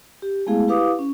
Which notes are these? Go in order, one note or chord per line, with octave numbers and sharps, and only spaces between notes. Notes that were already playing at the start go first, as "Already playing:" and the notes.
G4
G#3 A3 B3 E4 G#4 F5
E4 G4 B4 F5 D6 D#6
C#4